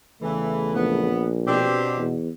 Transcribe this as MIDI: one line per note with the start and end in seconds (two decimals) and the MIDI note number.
0.22 1.10 40
0.22 1.10 49
0.22 0.72 52
0.22 1.10 57
0.74 1.70 34
0.74 1.25 59
1.47 2.16 47
1.47 2.01 60
1.47 2.01 62
1.47 2.01 67
1.97 2.29 40